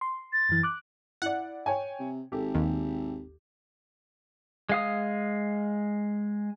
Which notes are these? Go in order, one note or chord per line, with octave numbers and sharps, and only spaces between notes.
C6
A6
F#2 E3
D6 F#6
E4 D5 F#5
C#5 G5 G#5
C3
G#1 G4 A4
D#2
G#3 F5 D#6